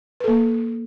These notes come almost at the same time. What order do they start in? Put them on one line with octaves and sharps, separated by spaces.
B4 A4 A#3